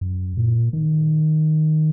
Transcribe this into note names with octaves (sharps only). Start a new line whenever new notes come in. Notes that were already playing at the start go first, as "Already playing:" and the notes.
F#2
A#2
D#3